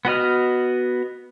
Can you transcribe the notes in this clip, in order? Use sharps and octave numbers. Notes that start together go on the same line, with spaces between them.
B3 F#4 D#5 F6